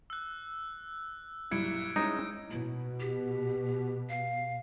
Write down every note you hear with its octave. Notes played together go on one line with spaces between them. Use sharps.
E6 F#6
B1 G2 A#2 E4 G#6 C#7 D7
G3 G#3 C#4 D#4 E4 C#5
B2 E4
G4
F5